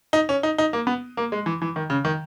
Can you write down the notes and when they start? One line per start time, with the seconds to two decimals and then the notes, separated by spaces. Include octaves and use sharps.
0.13 D#4
0.29 C#4
0.43 D#4
0.58 D#4
0.73 A#3
0.87 B3
1.17 A#3
1.32 G#3
1.46 E3
1.62 E3
1.76 D#3
1.90 C#3
2.05 D#3